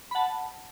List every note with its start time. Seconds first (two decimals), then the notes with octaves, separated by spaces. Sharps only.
0.11 B5
0.15 F#5 A5